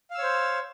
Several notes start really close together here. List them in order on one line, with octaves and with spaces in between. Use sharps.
F5 E6 C#5 C5